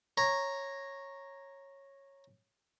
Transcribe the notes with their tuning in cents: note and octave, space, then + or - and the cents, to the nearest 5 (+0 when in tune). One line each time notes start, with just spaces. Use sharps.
C#5 -10 A#5 +0